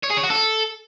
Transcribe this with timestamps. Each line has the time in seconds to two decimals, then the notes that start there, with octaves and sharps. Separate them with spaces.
0.04 C#5
0.10 G#4
0.17 C#5
0.24 F#4
0.30 A4